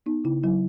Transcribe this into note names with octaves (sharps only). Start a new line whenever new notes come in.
B3 D#4
C#3 E4
F#3 E4